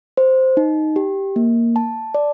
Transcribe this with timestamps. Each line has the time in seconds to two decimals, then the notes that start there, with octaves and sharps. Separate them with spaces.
0.17 C5
0.57 D#4
0.96 G4
1.36 A#3
1.76 A5
2.14 D5